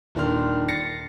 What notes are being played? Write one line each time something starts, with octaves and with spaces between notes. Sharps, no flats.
D#1 D#3 D4 C6 F6
A6 A#6 C7 C#7